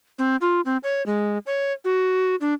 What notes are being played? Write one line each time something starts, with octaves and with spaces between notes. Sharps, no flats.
C4
F4
C4
C#5
G#3
C#5
F#4
D4